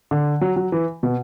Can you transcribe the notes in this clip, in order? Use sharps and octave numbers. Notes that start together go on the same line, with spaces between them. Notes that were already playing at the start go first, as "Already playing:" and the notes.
D3
F#3
F#3
E3
B2